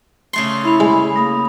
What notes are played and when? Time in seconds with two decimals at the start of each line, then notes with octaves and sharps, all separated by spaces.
0.33 C#3 A3 C6
0.65 E4 B5 F7
0.80 G#3
1.16 A#3 B5 D#6 A#6